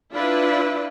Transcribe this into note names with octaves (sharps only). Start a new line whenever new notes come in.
D4 E4 F4 B4 D5